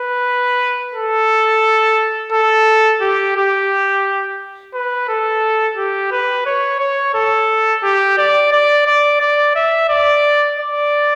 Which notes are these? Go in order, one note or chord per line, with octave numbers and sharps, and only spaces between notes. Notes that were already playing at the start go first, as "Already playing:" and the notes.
Already playing: B4
A4
A4
G4
G4
B4
A4
G4
B4
C#5
C#5
A4
G4
D5
D5
D5
D5
E5
D5
D5